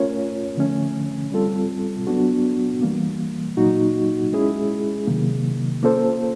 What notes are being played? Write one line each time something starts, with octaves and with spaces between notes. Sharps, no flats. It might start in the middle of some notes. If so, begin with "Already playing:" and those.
Already playing: A3 C#4 F4 A#4 C#5
D3 F3 A3 C#4
G3 C4 F4 A4
F#3 B3 D4 F#4
E3 G3 A#3
A#2 F#3 A#3 D#4 F#4
G#3 C#4 E4 G#4
C3 D#3 F#3 A#3
A#3 C#4 F4 A4 C5